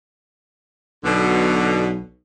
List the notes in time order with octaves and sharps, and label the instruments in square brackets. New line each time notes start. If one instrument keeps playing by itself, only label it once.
[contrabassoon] B1 [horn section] B2 D3